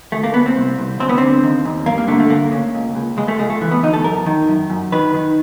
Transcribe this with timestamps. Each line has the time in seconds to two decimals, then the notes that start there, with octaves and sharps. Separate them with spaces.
0.12 D2 A3
0.23 A#3
0.34 D2 B3
0.46 C4
0.56 C2
0.78 C2
1.00 D2 C4
1.09 B3
1.18 D3 C4
1.43 D#2
1.65 D#2
1.86 G2 A#3
1.98 A#3
2.08 D3 A3
2.20 A3
2.30 D2 A#3
2.52 C#3
2.74 C#2
2.95 C#2
3.17 C#2 G#3
3.28 A3
3.39 C#2 G#3
3.50 A3
3.61 E3
3.71 B3
3.83 D2 D#4
3.93 A4
4.04 F#2 A#4
4.26 D#3
4.49 F#2
4.70 F#2
4.92 D#3 B4
5.14 D#3